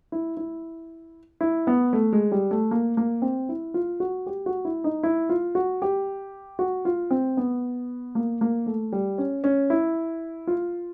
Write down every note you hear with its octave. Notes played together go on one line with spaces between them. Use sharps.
E4
E4
E4
B3
A3
G#3
G3
A3
A#3
A#3
C4
E4
F4
F#4
G4
F#4
E4
D#4
E4
F4
F#4
G4
F#4
F4
C4
B3
A#3
A#3
A3
G3
C#4
C#4
E4
F4